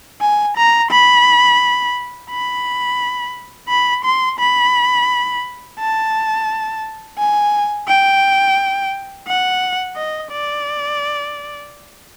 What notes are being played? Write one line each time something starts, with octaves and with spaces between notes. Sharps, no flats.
G#5
A#5
B5
B5
B5
C6
B5
A5
G#5
G5
F#5
D#5
D5